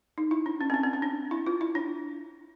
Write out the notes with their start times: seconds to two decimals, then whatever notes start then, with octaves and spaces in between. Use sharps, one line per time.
0.18 D#4
0.31 E4
0.46 D4
0.61 C#4
0.70 C4
0.74 C#4
0.83 C4
0.93 C#4
1.02 D4
1.31 E4
1.46 F4
1.61 E4
1.75 D4